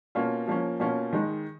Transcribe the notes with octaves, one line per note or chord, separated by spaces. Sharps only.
B2 A#3 C#4 F4
F3 A#3 C#4
B2 A#3 C#4 F4
D#3 G#3 D#4